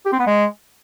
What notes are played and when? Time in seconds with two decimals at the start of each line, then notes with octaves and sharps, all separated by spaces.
0.06 G4
0.13 C4
0.20 B3
0.27 G#3